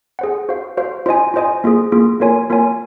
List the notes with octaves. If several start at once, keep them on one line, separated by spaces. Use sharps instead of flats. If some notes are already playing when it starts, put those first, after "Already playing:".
G#4 C5 F#5
F#4 C5 F5
F#4 C5 F5
F4 C5 D#5 G#5
F4 C5 D#5 G#5
A#3 F4 G#4
A#3 F4 G#4
A#3 F4 A#4 C#5 G#5
A#3 F4 A#4 C#5 G#5